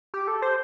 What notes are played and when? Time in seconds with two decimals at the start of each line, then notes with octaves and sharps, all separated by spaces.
0.14 G4
0.28 A4
0.42 C5